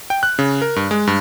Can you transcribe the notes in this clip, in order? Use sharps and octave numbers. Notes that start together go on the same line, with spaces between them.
G5
F#6
C#3
A#4
G2
G#3
G2